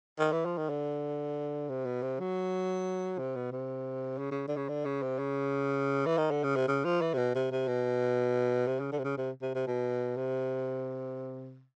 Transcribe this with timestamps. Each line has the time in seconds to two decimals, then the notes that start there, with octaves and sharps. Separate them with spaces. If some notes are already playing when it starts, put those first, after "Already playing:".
0.19 D#3
0.33 E3
0.45 F3
0.57 D#3
0.69 D3
1.69 C3
1.85 B2
2.02 C3
2.20 F#3
3.19 C3
3.36 B2
3.52 C3
4.18 C#3
4.31 C#3
4.48 D3
4.57 C#3
4.69 D3
4.85 C#3
5.02 C3
5.19 C#3
6.06 E3
6.18 D#3
6.31 D3
6.44 C#3
6.56 C3
6.68 C#3
6.85 F3
7.01 E3
7.14 C3
7.17 B2
7.35 C3
7.52 C3
7.68 B2
8.67 C3
8.80 C#3
8.92 D3
8.99 C3
9.04 C#3
9.18 C3
9.42 C3
9.55 C3
9.67 B2
10.17 C3